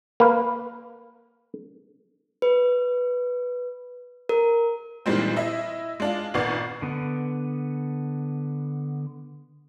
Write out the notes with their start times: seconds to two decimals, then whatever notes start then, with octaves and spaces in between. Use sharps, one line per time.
0.20 A#3 B4
2.42 B4
4.29 A#4
5.06 A#2 D#3 E3 G3 G#3 C4
5.36 E4 D#5 E5
6.00 G#3 D4 F4
6.34 G#1 A#2 B3 D5 C#6 C7
6.82 D3 B3